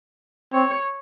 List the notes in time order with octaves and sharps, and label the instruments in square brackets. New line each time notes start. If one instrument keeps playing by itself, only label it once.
[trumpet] C4 [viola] C#5